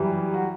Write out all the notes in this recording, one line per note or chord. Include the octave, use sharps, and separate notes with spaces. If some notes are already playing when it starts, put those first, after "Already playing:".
Already playing: F#2 E3 G3
F#4